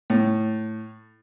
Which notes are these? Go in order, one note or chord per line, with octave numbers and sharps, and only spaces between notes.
A2